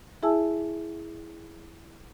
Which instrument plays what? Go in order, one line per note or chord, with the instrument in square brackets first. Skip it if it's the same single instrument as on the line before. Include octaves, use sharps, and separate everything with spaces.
[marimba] E4 G#4 E5 G#5 A5 E6